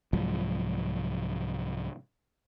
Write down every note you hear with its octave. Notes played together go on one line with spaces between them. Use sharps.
C2 G#2 F3 F#3